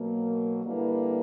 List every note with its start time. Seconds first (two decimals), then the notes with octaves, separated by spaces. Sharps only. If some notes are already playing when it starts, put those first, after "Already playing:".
Already playing: B2 F#3 A#3
0.65 D3 G3 A#3 E4 B4